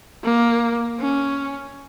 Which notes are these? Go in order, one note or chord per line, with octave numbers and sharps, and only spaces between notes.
A#3
C#4